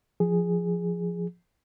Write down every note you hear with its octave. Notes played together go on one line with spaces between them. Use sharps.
F3 G#4